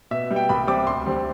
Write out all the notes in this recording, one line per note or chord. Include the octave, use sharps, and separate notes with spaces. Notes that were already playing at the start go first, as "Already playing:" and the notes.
B2 E5
G3 B3
G5
C2 B5
C3 G3 C4 D6
D2 C6
D3 G3 C4